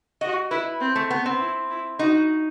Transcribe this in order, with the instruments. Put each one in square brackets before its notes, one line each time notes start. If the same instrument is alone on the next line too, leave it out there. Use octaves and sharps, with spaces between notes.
[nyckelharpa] F#4 [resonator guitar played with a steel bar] D#5
[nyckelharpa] E4 [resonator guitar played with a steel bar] B4
[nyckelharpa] C4
[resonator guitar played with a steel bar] A3
B3
C4
[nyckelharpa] E4
E4
[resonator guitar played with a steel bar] D#4 [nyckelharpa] F#4